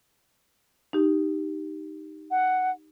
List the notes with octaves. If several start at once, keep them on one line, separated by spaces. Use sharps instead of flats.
D#4 G4
F#5